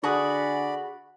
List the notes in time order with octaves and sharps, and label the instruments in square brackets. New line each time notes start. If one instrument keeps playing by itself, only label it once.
[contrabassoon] D3 [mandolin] F#4 [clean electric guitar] G#4 [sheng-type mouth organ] D5 B5